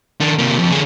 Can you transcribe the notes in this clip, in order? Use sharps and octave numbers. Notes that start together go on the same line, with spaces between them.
D#3 D4
C3 A#3
F2
D3 G#4